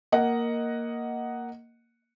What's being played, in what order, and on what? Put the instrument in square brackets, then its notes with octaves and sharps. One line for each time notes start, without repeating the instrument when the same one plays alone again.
[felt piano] A#3 D#5 F#5